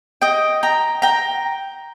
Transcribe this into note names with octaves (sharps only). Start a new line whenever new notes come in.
D#5 G5
G5 A#5
G5 A#5